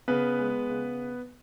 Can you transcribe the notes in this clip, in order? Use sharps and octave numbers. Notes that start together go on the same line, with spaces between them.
C#3 B3 B4
G#3
C#3